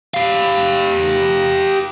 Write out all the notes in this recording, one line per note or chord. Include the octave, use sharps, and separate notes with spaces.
G4 F5